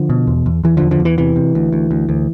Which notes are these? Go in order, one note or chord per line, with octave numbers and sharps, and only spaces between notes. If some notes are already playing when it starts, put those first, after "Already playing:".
Already playing: D3 F3
B2
E2
E2
E2 E3
E2 D3 F3
D3 F3
E2
E3
C3 E3
C3
D2
D2
D2
D2